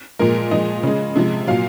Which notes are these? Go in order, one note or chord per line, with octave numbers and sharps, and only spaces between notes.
A#2 F3 G#3 A#4
A#2 F3 G#3 D#5
C#3 G#3
C3 F3 G#3
A#2 F#3 F5